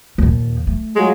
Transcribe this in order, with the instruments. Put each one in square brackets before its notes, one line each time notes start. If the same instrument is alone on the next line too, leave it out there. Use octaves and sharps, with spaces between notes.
[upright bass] D#2 A#2
A3
[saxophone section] F#3 G#3 F4